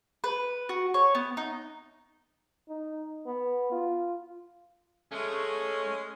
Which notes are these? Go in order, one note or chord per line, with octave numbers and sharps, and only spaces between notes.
B4
F#4
C#5
B3
D#4
D#4
B3
F4
G#3 A3 C#4